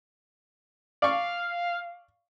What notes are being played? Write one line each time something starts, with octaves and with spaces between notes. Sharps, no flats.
D5 F5 C#6